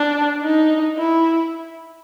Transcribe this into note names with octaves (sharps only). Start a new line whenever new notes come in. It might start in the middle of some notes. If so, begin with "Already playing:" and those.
Already playing: D4
D#4
E4